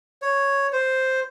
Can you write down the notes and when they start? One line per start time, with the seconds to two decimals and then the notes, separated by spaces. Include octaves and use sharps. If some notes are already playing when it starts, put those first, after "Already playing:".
0.22 C#5
0.73 C5